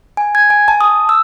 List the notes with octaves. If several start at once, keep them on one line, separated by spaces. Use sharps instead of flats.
G#5
G#6
G#5
A5
D#6
E6